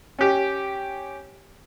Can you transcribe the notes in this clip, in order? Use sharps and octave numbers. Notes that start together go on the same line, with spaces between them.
C#4 G4